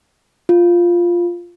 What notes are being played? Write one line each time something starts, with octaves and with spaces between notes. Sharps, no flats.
F4